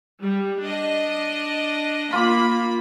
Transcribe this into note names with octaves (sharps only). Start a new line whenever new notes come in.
G3
D4 D#5
A#3 F4 B5 D6